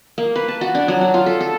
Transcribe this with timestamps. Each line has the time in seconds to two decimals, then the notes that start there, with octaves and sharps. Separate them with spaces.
0.18 A#3
0.36 B4
0.48 A5
0.61 F#4
0.75 D4
0.88 F#3
1.01 F#4
1.14 F4
1.26 A4
1.41 A4